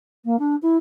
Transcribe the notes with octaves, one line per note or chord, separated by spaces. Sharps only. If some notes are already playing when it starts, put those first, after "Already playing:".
A#3
D4
E4